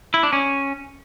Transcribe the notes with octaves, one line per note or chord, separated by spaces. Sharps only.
E4
D4
C#4